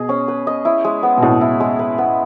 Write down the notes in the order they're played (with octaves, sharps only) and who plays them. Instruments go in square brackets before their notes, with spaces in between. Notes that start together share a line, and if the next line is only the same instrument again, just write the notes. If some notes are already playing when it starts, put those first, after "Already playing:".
Already playing: [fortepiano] B2 [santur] G#4 D#5
[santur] C#4
B4
D#5
E4
G#3
B3
[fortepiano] B2
[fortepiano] A2 [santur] G#3
[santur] E4
G#3
B4
B3